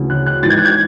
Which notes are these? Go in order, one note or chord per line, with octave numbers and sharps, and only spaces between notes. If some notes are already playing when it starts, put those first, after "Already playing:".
Already playing: D2 C#3 E3
F#6
F#6
G#2 E3 A6
G#6
F#6
G#6